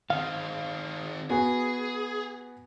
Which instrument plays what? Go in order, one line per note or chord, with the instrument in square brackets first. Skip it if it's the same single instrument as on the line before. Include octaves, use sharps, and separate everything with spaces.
[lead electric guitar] D#3 C4 [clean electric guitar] F5
[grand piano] B3 F#4 G#5 [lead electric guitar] G#4